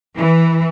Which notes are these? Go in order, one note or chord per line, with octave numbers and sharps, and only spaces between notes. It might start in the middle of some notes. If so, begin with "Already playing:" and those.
E3